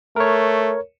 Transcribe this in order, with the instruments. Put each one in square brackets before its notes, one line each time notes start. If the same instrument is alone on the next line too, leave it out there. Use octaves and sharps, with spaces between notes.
[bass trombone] A3 [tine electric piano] A#4 C#5